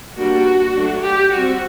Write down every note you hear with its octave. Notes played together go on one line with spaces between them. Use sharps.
G3 A#3 D4 F#4
F#3 A3 D4
G4
G3 C4 F#4